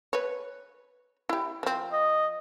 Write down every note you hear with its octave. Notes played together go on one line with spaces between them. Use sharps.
B4 C#5
E4 G4
F3 C4
D#5